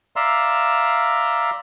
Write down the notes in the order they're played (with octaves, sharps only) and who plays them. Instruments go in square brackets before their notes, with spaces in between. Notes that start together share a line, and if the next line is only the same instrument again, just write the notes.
[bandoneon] D5 E5 F5 A#5 C6 E6